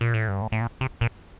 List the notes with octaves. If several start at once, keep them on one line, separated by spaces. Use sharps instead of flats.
A#2
A2
G2
A2
A2
A#2
C3
A#2